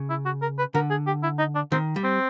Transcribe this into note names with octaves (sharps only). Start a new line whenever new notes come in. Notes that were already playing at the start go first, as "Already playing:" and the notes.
Already playing: C#3
E4
F#4
A#4
B4
D3 A#4
G#4
G4
E4
D#4
D4
D#3 C4
G3
C4